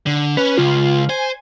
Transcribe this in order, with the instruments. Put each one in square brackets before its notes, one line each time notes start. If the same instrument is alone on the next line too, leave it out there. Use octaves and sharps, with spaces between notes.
[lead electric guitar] D3
[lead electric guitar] C#4 [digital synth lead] B4
[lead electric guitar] C#2 [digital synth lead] F4
[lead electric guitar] C5 [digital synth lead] G#5